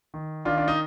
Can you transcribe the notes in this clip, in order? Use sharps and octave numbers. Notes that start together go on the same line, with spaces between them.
D#3
D#3 D4 F4
D4
D#4